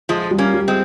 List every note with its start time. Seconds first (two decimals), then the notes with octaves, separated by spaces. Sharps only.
0.09 F3 G#3 F4
0.31 G3
0.38 A#3 C#4
0.54 G3
0.68 G#3 C4